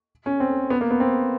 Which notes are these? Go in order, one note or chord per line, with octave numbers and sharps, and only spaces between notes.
C#4
C4
B3
A#3
B3
C4